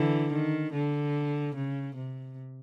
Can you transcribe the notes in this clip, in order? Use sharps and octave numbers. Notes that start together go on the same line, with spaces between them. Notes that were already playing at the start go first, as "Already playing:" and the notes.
Already playing: D3 E3
D#3
D3
C#3
C3